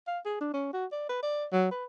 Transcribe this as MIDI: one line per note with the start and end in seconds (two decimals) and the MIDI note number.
0.07 0.19 77
0.25 0.37 68
0.41 0.50 62
0.53 0.69 61
0.73 0.85 66
0.92 1.04 74
1.09 1.22 71
1.22 1.45 74
1.52 1.69 54
1.71 1.84 71